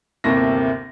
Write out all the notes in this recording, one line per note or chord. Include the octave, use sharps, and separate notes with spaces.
G1 D#2 C3 A#3 E4 A#6